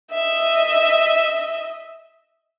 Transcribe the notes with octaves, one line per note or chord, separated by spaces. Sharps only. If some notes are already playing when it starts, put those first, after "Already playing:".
D#5 E5